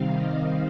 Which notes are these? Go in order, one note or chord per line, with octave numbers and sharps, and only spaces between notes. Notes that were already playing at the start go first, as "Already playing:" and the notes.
Already playing: C3 D#3 G3 C4 F5
D#5